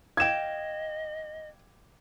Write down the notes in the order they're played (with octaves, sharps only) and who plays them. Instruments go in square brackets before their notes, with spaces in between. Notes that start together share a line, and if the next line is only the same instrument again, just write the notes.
[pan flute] D#5 [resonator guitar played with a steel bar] F5 G5 [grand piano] G#6 E7